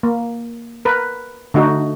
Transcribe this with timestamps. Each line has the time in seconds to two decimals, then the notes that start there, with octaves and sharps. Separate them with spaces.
0.03 A#3
0.85 A#4 B4
1.54 D3 A3 D#4 F#4